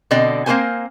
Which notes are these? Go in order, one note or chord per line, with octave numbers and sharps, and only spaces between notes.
B2 D3 C4 D5 D#5
A#3 C4 F4 A#4 C5 G#5